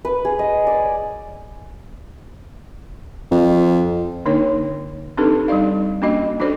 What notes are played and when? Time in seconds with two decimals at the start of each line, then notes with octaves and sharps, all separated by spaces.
0.05 B4
0.25 G#4
0.39 D#5
0.67 D5
3.31 F2
4.26 D3 A#3 D4 D#4 C#5
5.17 C4 D4 D#4 G4 A4 B4
5.48 G3 D4 D#4 D5 F5
6.02 A#3 C#4 D4 F#4 D#5
6.40 D4 F#4 A4 C5 D5